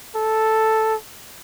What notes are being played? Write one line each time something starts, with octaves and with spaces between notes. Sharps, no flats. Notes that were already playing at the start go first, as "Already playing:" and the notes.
A4